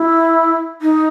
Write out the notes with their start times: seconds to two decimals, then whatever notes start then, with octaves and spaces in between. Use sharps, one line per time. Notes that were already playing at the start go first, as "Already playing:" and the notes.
Already playing: E4
0.82 D#4